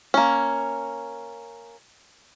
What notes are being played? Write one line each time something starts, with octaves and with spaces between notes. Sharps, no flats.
A#3 C#4